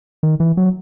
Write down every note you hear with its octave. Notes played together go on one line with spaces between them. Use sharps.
D#3
E3
F#3